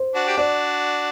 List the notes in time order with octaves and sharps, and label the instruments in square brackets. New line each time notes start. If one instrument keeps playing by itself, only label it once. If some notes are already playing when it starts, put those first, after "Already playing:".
Already playing: [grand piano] C5
[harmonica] D4 F#4
G4
[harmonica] D4 F#4 [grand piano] D5